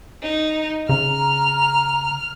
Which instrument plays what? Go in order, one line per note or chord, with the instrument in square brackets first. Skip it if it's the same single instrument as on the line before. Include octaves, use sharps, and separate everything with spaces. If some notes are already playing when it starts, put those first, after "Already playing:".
[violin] D#4
[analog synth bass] C#3 [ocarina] A#5 [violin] F6